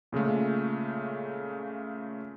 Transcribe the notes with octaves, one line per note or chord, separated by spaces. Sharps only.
A#2 C#3 G#3 A3